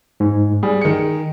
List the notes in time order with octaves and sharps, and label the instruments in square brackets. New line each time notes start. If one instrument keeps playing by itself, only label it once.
[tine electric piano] G#2
[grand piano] G3 [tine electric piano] G#4
[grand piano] D#3 C#7